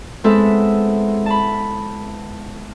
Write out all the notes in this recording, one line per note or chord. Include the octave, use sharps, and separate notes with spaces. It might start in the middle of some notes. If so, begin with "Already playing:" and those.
G#3 B3 C4 E4 A4 E5
A5 B5